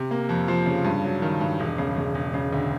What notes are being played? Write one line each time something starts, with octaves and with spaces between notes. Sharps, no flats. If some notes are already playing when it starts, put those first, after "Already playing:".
Already playing: C3
A#3
F2
F3
C#3
G2
F#3
D#3
G2
E1
C#3
C#3
E1
C#3
D2